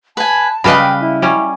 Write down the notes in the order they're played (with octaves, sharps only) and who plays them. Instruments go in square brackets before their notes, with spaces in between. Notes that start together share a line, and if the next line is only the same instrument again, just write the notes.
[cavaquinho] B4 G#5 [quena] A5
[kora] C#3 G3 B4 [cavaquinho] D#5 F5 B5
[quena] G5
E4
[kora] G3 C#4